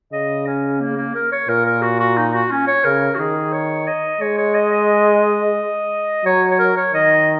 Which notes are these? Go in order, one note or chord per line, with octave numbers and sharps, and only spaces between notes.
C#3 D#5
C#4
A#3
A#3
A#4
C#5
A#2 A#4
A#4
F#4
F#4
D#4
F#4
C#4
C#5
C#3 A#4
F#4
D#3 G#4
C#5
D#5
G#3 C#5
C#5
D#5
D#5
F#3 C#5
C#5
A#4
C#5
D#3 D#5